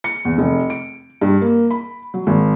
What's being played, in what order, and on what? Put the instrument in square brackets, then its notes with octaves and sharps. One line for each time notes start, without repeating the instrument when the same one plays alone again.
[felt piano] C#7
E2
F1
D7
G2
A#3
B5
F#3
G#1